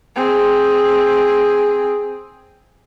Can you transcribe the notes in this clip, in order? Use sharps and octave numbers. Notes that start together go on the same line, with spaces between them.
C4 G#4